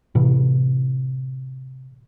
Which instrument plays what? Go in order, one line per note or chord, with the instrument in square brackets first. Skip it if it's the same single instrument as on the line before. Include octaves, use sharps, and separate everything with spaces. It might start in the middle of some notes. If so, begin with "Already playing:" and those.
[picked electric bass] A2 C3 E3